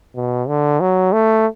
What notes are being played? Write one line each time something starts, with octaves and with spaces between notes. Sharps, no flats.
B2
D3
F#3
A3